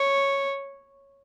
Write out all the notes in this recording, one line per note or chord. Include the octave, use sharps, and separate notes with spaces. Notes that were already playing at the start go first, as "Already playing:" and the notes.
Already playing: C#5